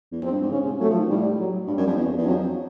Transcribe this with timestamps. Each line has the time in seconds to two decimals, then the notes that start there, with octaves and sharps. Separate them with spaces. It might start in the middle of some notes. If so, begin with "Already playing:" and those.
0.12 E2
0.22 F2 C4
0.32 G2
0.42 G#2
0.51 C#3 C#4
0.66 C3
0.81 F#3 A3
0.90 F3
1.00 D#3
1.09 A2 G3
1.39 F#3
1.67 G2 G3
1.78 F#2
1.87 F2
1.97 E2
2.18 E2
2.26 F2 F#3